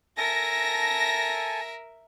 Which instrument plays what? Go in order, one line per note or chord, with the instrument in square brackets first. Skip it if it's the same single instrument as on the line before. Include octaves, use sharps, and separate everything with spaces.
[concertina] A4 G#5 A5 [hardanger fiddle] A#4 E5 [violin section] A#6